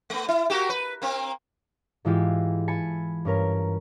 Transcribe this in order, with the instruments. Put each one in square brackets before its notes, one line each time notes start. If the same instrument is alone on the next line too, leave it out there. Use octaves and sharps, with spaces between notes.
[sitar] A3 B3
E4
A#3 F#4 G4
B4
A#3 C4
[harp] G#2 E3 G#3 E4 F4 G4
G#5 A5 B5 C#7
G2 C#4 A#4